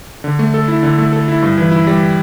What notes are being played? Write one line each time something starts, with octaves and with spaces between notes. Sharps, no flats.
D3
A3
A4
E4
D3
A3
A4
E4
G2
E3
E4
G3